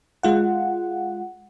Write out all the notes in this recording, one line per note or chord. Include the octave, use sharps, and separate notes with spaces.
G#3 F4 F#5